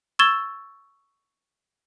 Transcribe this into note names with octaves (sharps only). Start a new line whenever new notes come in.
C#6 E6 G#6 A6 E7 G7